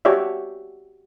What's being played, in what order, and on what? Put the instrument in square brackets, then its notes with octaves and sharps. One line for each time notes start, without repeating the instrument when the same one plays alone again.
[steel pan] F#4 G4 C#5 D5 E5